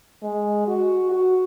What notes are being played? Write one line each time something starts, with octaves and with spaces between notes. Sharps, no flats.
G#3
F#4
F#4